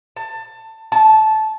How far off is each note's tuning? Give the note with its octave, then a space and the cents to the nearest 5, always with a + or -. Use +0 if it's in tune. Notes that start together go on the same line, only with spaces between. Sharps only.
A5 +20
A5 -15